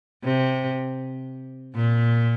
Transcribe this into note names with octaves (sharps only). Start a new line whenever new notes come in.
C3
A#2